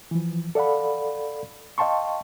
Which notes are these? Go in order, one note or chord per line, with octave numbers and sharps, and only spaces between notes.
E3 F3
A4 D5 F5 F#5 B5
D#5 F5 G5 A5 C6 C#6